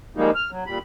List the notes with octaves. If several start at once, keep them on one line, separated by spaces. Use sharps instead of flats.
F3 G3 G#3 A#3 D#4
F6
F#3
A#2 G3 B5